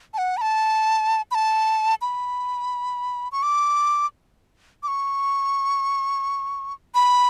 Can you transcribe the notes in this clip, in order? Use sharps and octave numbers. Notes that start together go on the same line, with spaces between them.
A5
F#5
B5
A5
B5
A5
B5
C#6
D6
D6
C#6
B5